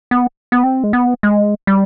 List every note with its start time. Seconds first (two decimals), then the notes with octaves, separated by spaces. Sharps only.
0.11 B3
0.52 B3
0.63 C4
0.84 G#3
0.93 B3
1.23 G#3
1.67 G3